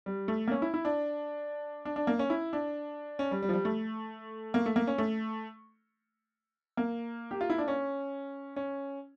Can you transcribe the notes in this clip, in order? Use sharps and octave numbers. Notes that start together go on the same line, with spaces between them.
G3
A3
A#3
C#4
E4
E4
D4
D4
D4
A#3
C#4
E4
D4
C#4
G3
G3
F3
G3
A3
A#3
A3
A#3
C#4
A3
A#3
G4
F4
E4
D4
C#4
C#4